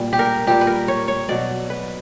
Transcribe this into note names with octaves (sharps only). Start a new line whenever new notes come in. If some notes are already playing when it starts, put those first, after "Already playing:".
Already playing: A#2 G3
G4
A#4
A#2 G3 G4
B4
A#4
C#5
C#5
B2 F#3 D5
B4